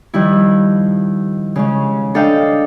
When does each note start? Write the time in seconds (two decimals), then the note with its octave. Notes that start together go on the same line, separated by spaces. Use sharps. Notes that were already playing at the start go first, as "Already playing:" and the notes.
0.14 D#3 F3 G3 E4
1.56 C#3 G#3 C#4
2.14 D4 A4 D#5 F5 G5